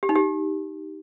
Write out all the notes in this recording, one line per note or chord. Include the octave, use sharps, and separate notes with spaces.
G4
D#4
G4